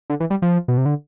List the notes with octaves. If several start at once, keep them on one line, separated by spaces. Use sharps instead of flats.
D3
E3
G3
F3
B2
C3
D3